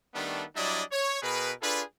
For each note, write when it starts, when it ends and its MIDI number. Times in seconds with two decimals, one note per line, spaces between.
0.15 0.44 51
0.15 0.44 55
0.15 0.44 57
0.15 0.44 59
0.15 0.44 62
0.56 0.83 54
0.56 0.83 55
0.56 0.83 62
0.56 0.83 64
0.56 0.83 74
0.56 0.83 75
0.92 1.19 73
1.23 1.52 47
1.23 1.52 68
1.23 1.52 70
1.23 1.52 71
1.62 1.83 62
1.62 1.83 65
1.62 1.83 68
1.62 1.83 69
1.62 1.83 71